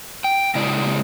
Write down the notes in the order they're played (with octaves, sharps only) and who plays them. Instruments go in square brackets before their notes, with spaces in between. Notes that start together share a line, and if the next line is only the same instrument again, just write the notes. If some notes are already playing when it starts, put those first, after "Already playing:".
[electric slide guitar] G5
C#3 G#3 E4 D5